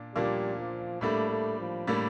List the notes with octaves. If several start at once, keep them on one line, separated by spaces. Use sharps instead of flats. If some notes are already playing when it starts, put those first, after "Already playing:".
Already playing: A#2 D4
A#2 F3 G3 A#3 D4
F3
A2 G3 A3 A#3 D4
A3
F3
A2 G3 A#3 D4